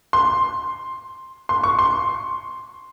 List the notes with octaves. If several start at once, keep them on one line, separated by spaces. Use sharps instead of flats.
C6
C6
C#6
C6